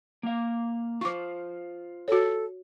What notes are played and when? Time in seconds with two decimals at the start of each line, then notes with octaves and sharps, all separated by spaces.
0.23 A#3 F5
1.01 F4 C5 C#6 D6
2.08 F#4 A4 C#5